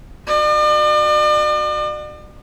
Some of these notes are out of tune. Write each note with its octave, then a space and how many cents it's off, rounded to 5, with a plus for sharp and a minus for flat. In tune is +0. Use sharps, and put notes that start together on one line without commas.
F#4 -10 D5 +45